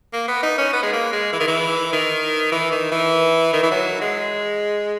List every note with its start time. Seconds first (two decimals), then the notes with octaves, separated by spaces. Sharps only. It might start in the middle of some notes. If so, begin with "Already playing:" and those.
0.13 A#3
0.28 B3
0.43 D#4
0.58 C#4
0.73 B3
0.83 G#3
0.93 A#3
1.13 G#3
1.32 E3
1.40 D#3
1.48 E3
1.93 D#3
2.52 E3
2.72 D#3
2.92 E3
3.53 D#3
3.63 E3
3.71 F#3
4.01 G#3